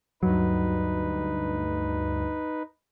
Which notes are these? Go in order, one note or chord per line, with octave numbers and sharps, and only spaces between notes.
D2 G2 F#3 D#4 B4